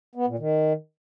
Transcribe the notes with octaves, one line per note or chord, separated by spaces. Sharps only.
B3
A#2
D#3